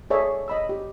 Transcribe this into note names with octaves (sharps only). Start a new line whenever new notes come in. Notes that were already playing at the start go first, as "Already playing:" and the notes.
G#4 A4 C#5 D5 E5
D#5 B5 E6
G4